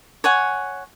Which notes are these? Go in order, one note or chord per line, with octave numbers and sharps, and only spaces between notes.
C#5 F#5 G#5